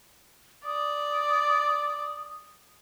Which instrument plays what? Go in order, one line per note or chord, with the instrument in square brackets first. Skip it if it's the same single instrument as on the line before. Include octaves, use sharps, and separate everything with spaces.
[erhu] D5 [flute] D#6